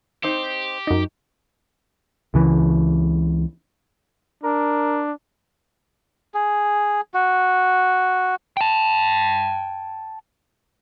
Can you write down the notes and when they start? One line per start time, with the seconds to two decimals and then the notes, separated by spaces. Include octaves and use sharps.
0.23 C4 D#4 G4 C5
0.87 F#2 D#4
2.34 C#2 C#3 E3
4.43 D4 A#4
6.34 G#4
7.14 F#4
8.57 G5 A5